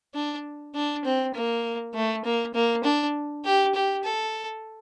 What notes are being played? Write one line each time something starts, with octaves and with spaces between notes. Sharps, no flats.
D4
D4
C4
A#3
A3
A#3
A#3
D4
G4
G4
A4